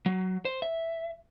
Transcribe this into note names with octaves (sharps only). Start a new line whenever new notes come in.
F#3
C5
E5